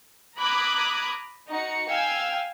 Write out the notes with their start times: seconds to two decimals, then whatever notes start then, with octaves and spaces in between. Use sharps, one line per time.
0.37 A#5 B5 D6 D#6 F#6 G#6
1.49 D#4 F#4 C#7
1.89 F5 G5 G#5 E6